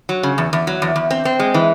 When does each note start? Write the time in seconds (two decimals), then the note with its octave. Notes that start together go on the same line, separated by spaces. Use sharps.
0.09 F#3
0.23 C#3
0.38 E2
0.53 E2
0.67 F#3
0.82 E2
0.96 E2
1.11 C4
1.25 C4
1.39 G#3
1.54 E3